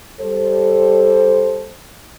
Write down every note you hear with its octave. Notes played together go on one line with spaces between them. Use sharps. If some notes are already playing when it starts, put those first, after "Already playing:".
G3 A4 C5